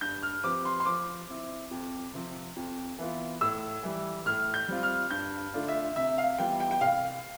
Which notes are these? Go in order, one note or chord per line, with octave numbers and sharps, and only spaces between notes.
G2 G6
F6
F3 C4 G4 B4 D6
C6
C6
F3 D6
C4 E4
F2
C3 F3 C4
F2
E3 B3 F4
A2 E6
E3 G3
A2 F6
G6
G3 C4 F4
F6
G2 G6
D3 A3 D4 F4
E5
C3 E5
F5
E3 G3 B3 F4 G5
G5
G5
C2 F5